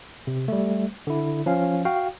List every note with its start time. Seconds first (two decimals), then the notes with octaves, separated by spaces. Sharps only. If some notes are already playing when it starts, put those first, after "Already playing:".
0.27 C3
0.48 G3 A3
1.07 D3 E4
1.46 F3 C#4 F5
1.85 F#4 F5 G5